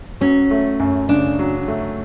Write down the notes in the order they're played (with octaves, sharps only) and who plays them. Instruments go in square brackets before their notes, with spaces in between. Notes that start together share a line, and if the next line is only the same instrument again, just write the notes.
[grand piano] F#3 [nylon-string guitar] C#4
[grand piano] A3
F#2
[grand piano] C#3 [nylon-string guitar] D4
[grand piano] F#3
A3